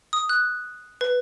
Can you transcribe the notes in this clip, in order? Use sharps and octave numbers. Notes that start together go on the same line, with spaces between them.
D#6
F#6
B4